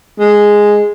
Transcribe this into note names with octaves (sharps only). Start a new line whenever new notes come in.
G#3